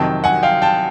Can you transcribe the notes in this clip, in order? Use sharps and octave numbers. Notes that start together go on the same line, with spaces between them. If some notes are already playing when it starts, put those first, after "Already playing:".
Already playing: F2 C3 D#3 F#3 G5 A5
F#5 G#5
F5 G5
G5 A5